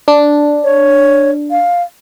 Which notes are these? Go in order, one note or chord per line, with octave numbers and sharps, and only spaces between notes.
D4
C#5
F5